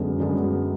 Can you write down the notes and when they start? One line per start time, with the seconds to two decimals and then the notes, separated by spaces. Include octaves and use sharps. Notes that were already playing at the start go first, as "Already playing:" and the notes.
Already playing: F#2 D3 G#3 B3 D4
0.18 F#2 D3 G#3 B3 D4